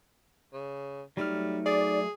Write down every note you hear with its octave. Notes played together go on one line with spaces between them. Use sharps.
C#3
F#3 G3 A3 D#4 F6
G#4 D5